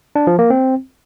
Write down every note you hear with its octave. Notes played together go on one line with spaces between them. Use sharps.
D4
F3
A#3
C4